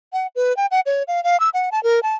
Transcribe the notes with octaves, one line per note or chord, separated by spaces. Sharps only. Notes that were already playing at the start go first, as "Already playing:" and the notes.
F#5
B4
G5
F#5
C#5
F5
F5
E6
F#5
A5
A#4
A5